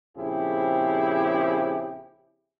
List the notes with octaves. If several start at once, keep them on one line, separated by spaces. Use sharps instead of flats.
A#1 C#3 C4 E4 G4 G#4